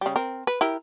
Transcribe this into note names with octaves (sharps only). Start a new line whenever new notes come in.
C#3 G3
C4 A#4
B4
E4 G4 A#4